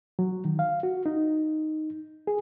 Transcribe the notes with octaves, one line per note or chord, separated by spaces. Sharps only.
F#3
D#3
F5
F#4
D#4
G#4